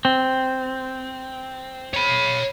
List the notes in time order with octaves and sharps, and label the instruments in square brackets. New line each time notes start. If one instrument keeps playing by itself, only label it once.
[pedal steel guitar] C4
[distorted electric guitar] C#5 B5